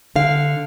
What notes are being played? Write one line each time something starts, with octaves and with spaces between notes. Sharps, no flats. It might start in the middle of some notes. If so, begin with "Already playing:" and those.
D3 F5